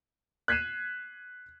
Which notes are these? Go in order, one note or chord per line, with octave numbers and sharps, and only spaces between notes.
F#6 G#6 B6 C7 D#7 E7